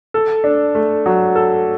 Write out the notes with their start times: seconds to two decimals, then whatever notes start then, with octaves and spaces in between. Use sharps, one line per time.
0.14 A4
0.44 D4
0.75 A3
1.06 F#3
1.36 A4